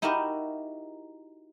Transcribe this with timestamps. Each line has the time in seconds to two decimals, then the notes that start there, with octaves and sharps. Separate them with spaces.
0.02 D#4 E4 F#4 G4 A#4 D#5